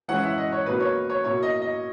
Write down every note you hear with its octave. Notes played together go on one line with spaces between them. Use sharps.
E3 G#3 C#4 E4 F#5
E5
D#5
C#5
B2 A#3 D#4 B4
C#5
C#5
B2 A#3 E4 C#5
D#5
D#5